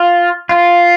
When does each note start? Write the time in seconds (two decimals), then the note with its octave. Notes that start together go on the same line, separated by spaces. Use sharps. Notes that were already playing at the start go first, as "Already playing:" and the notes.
Already playing: F4
0.49 F4